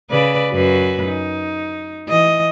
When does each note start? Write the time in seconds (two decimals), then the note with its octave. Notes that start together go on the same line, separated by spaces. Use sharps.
0.11 C#3 B4 D5
0.51 F#2 F#4 B4
1.08 D#4
2.08 E3 D#5